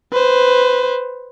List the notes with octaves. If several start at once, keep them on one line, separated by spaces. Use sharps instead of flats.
B4 C5